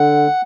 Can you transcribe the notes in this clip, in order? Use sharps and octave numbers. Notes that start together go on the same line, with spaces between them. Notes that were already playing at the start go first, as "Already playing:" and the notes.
Already playing: D3 F#5